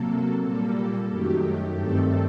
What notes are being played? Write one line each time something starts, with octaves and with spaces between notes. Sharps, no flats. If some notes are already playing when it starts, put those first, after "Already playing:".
Already playing: C3 F#3 A#3 A4
A#2 G3 A#3 A4
F#2 D#3 F#3 A3 G4
G2 D#3 A3 C4 A4